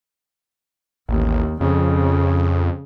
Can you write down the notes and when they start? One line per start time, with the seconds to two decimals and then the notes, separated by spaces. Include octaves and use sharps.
1.09 A1 D#2
1.61 F2 C#3